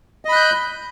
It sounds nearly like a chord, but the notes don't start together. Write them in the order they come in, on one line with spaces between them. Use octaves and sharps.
D#5 B5 F#6 G6